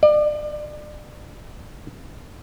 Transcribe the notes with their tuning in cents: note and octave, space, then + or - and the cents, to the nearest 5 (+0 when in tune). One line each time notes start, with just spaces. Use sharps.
D5 +35